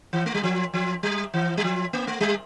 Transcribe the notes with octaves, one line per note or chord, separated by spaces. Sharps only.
E3
A3
G3
F3
F3
G3
E3
G3
F3
A#3
A3
G3